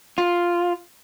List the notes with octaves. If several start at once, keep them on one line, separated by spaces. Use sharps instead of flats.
F4